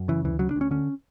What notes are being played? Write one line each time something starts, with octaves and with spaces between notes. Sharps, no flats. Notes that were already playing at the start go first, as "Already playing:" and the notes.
Already playing: F#2
C#3 E3
D2 E3
C#3 F#3
D4
D2 C#4
D3 C#4